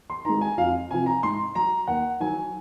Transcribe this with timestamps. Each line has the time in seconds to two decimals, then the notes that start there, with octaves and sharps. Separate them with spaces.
0.10 C6
0.25 D#3 G#3 A#5
0.41 G#5
0.57 F2 F5
0.91 C3 F3 G#5
1.06 A#5
1.23 G#2 C6
1.55 F#3 A#5
1.87 D#2 F#5
2.20 D#3 F#3 G#5